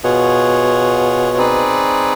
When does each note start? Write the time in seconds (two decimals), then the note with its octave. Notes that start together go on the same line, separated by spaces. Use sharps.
0.03 B2 F4 G#4 C#5 F#5
1.37 C4 D#4 G#4 B4 D5